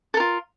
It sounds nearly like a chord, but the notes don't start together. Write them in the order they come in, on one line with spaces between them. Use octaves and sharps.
A4 A#4 F4